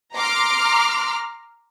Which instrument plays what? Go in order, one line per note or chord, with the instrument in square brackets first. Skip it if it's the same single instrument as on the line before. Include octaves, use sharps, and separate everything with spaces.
[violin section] A#5 C6 D6 F6